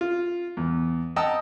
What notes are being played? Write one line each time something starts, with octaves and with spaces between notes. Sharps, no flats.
F4
E2
D#5 F#5 G5 A5 A#5 E6